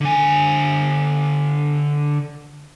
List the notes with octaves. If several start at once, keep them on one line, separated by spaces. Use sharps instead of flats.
D3 G#5